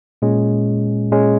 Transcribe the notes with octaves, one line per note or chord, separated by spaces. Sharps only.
A#2 G#3 C#4
A#2 G#3 C#4